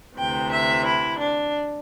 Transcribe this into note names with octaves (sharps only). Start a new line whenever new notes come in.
D2 C3 E3 G5
E5
E4
D4